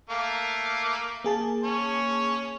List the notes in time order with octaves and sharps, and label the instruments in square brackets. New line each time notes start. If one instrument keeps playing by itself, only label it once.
[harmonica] A3 A#3 F5
[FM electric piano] A#3 G#4 A5
[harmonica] C#4 C#5